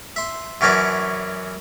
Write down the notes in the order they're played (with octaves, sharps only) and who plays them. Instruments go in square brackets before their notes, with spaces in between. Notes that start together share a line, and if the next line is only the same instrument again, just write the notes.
[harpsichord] E5 C6
F#2 E3 C#4 D4 F#4 D6